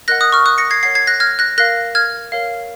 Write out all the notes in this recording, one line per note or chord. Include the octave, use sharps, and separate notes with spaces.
A#4 D#5 F#5 F#6 A#6
D#6 F#6
C#6 F6
D#6 F#6
A#6 C#7
G#6 C7
A#4 C#5 F#5 G#6 C7
G#6 C7
F#6 A#6
F6 G#6
F#6 A#6
A#4 F5 F#6 A#6
F6 G#6
A#4 C#5 F5